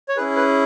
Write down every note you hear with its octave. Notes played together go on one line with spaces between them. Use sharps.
C#5
C#4 E4 G#4 B4
B4